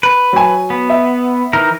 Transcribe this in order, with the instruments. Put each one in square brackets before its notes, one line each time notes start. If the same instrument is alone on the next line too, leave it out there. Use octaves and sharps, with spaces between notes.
[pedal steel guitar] B4
[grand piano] F#3 G#5
[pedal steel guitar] B3
[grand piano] E5
[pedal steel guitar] E3 D#4 A#4